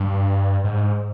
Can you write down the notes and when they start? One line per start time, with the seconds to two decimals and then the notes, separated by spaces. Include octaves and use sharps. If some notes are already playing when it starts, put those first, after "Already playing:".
Already playing: G2
0.64 G#2